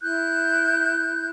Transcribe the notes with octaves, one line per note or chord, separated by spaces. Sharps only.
E4 F#6 G6